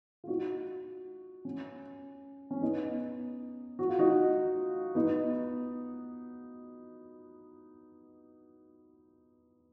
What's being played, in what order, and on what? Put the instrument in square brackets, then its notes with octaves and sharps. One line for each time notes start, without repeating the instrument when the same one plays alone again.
[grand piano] F4
D#4 F#4
C#4
C#4
B3 D#4
F#4
F4
D#4 F#4
B3 D#4